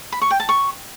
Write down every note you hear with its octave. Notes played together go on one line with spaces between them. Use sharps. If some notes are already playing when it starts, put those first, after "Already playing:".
B5
C#6
G5
A5
C#6